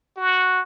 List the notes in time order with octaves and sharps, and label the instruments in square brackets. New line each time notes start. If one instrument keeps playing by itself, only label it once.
[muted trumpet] F#4